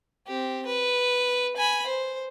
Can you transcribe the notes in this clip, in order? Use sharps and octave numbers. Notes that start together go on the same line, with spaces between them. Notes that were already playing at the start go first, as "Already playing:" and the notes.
C4 G4
B4
G#5 B5
C5